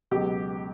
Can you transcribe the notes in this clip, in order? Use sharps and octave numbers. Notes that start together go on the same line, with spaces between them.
C#2 B2 F#3 G4